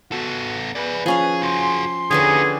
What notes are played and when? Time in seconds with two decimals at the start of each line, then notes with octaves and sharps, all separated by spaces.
0.12 B3 F#4 A4 F#5
0.75 G#4 B4 D5
1.06 F3 C#4 G#4 F5
1.43 F#4 G#4 C6
2.11 D3 C#4 D#4 G4 G#4 B4